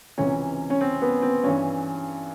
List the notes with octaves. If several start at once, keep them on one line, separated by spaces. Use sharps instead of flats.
C#2 C3 E3 C#4
C#4
C4
B3
C4
G2 E3 C#4